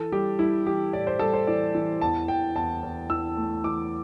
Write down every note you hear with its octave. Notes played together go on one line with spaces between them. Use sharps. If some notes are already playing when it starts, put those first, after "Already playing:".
Already playing: E3 A4
G3 G4
G3 E4
E3 G4
A2 D5
C5
G3 A4
C5
E3 D5
E3
E2 A5
E2 G5
E2 A5
E2
E3 E6
A3
E3 D6